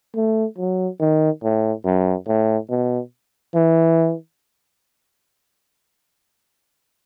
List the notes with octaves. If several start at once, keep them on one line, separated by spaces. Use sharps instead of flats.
A3
F#3
D#3
A2
F#2
A2
B2
E3